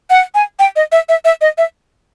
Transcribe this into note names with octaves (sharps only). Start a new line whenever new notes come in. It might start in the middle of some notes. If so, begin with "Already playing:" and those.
F#5
G#5
G5
D#5
E5
E5
E5
D#5
E5